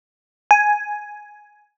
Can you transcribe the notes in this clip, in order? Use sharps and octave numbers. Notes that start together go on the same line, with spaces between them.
G#5